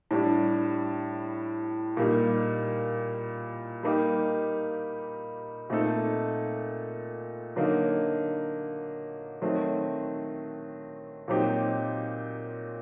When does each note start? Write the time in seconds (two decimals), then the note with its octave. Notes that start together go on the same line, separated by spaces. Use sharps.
0.11 A2 G3 D4
1.97 A#2 G3 A#3 D#4
3.83 G3 A#3 D#4 G4
5.70 A#2 A3 C4 D#4 A4
7.56 D3 F#3 A#3 D#4
9.41 D#3 F#3 A3 C4
11.28 A#2 F#3 C4 D#4 G4